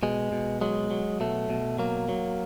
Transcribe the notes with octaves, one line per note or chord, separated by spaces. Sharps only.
B2 G#3
B2
F#3 G#3
F#3
B2 A3
B2
F#3 A#3
F#3